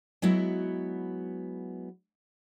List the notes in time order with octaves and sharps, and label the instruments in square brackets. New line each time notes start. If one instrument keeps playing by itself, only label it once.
[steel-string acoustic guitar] F#3 G#3 B3 E4 F#4